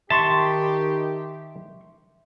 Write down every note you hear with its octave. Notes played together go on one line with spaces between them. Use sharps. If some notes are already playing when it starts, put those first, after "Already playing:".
D#3 D#4 G4 E5 A5 C6 C#6